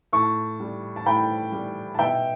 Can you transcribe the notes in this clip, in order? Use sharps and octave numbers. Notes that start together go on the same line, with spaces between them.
A2 A5 C#6
G3
A5
A2 G5 B5
G3
A5
B2 E5 G5